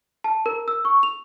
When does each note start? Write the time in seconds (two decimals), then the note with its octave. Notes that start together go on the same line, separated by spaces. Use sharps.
0.24 A5
0.46 A#4
0.68 E6
0.85 C#6
1.03 F7